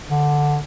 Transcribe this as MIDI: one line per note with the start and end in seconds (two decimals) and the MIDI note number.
0.10 0.58 50